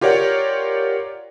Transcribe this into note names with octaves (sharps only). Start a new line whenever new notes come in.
F4 G4 A#4 C#5 D5 F#5